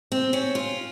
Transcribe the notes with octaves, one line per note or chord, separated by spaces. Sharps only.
C4
C#4
F4